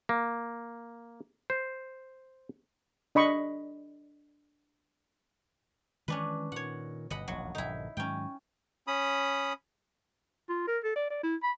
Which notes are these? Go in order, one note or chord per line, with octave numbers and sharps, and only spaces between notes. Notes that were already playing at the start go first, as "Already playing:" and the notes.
A#3
C5
D4 D#5 B5 C#6
D#3 E3 G#3 C#4 D4 B4
A#2 D#3 C#5 F#5
G1 B2 D#5 F#5 B5
E1 A#1 D#2 F#3
A#1 G2 D3 D#4 E4
G#2 D#3 F#3 C#4 G5
C#4 B5 D#6
F4
A#4
A4
D5
D5
E4
B5